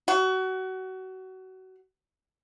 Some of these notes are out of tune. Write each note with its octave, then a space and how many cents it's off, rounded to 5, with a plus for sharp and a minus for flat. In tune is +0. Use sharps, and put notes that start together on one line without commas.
F#4 +25